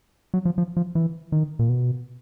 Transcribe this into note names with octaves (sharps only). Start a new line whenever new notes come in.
F#3
F3
F3
F3
E3
D#3
A#2
B2